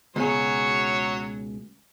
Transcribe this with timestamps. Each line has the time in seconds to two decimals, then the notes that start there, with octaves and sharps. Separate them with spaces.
0.16 C#2 B2 F#3 G#4 C#5